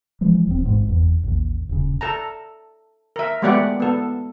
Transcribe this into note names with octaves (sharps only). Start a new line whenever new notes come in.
E3 F3 G#3
D#1 C4
A1 G#2
F#1 E2
A1 D#2
D#1 C#3
A4 A5 A#5
A#4 E5
G#3 A3 B3 G4 D5 F#5
B3 A4